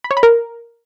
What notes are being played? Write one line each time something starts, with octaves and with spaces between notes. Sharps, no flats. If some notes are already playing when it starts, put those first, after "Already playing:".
B5
C#5
B5
A#4